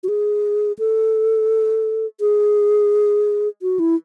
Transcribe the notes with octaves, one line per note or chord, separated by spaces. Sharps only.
F#4
G#4
A4
G#4
F#4
E4